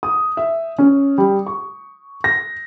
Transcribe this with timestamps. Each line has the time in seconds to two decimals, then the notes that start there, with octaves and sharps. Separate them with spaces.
0.03 D#6
0.37 E5
0.78 C#4
1.18 G3
1.47 C#6
2.24 A#6